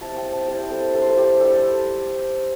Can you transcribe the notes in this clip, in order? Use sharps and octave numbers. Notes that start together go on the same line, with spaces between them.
G3 C4 E4 A5
G5
A5
G3 C4 E4 G5
G4
A4
G3 D4 A4
C5
A4
G4
G3 D4 A4